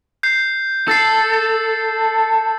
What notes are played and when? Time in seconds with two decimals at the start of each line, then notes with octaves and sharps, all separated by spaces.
0.23 G6 C7
0.88 A4 E6 A6 C7